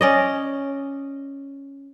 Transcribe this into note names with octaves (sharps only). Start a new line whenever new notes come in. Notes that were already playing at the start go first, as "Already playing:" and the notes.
C#4 D5 D#5